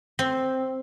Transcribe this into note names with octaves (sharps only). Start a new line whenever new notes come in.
C4